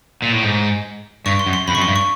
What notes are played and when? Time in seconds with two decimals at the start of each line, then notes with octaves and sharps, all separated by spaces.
0.22 A#2
0.32 A2
0.43 G#2
1.26 G2 C#6
1.39 C6
1.46 F#2
1.53 C6
1.68 F2 B5
1.75 C#6
1.77 F#2
1.82 C6
1.88 G2
1.96 C#6